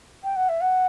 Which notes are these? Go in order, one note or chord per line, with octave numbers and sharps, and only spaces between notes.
G5
F#5
E5
F#5